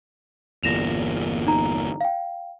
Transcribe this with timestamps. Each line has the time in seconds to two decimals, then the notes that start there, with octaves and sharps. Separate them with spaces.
0.63 G1 E2 A#2 A#6 E7 F7
1.47 D#4 A#5
2.01 F5 G5